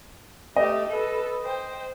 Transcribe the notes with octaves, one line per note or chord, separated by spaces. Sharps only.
A3 G4 D#5
A4 B4
C5 G5